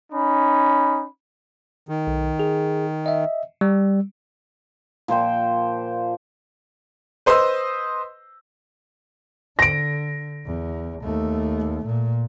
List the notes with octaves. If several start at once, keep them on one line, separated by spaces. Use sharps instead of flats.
C#4 D#4 B5
D#3
B1
G#4
D#5 E5
G3
A#2 F3 C5 G5
B4 C5 D#5 C6 D#6 E6
D3 A#6 D7
E2
D#2 A3
A#2